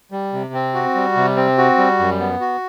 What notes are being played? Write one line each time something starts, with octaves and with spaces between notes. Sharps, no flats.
G3
C3
C4
F#4
G3
C3
C4
F#4
G3
F#2
B3
F#4